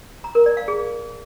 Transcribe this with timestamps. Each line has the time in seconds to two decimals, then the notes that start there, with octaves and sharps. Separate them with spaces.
0.24 A#5
0.35 A#4
0.46 D5
0.57 F5
0.68 G#4